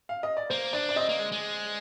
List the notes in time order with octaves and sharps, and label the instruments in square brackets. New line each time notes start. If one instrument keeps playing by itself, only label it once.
[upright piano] F5
D#5
D5
[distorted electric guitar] A#3 [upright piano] C5
[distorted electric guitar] D4 [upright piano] D5
[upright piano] D5
[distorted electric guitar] C4 [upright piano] D#5
[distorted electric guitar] A#3
G#3
G#3